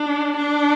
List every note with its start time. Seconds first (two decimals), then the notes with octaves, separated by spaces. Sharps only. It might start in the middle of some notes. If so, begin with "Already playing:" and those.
Already playing: D4
0.36 D4